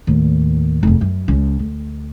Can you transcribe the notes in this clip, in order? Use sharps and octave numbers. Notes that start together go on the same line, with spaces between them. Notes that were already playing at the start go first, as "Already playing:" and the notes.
D#2 A2
F1 E2
F#2
C#2 C#4
D2